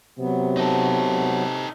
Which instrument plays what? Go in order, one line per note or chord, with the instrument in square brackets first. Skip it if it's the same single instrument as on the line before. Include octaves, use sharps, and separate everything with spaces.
[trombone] C3 [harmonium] F#3 B3
[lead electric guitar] D#4 A4